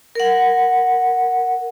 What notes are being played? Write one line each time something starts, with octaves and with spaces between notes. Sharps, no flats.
A#4 F#5